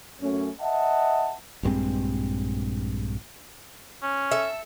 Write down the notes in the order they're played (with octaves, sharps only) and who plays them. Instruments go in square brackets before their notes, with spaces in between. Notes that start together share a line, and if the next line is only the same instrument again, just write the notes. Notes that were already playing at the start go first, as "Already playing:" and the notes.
[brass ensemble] F#2 A3 C#4
D#5 E5 F#5 A5
[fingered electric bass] A#1 G2 G#3 C4
[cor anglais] C#4
[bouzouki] A4 E5